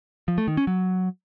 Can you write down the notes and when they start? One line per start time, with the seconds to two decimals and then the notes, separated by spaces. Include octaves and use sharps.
0.28 F3
0.38 A3
0.48 D#3
0.57 C#4
0.67 F#3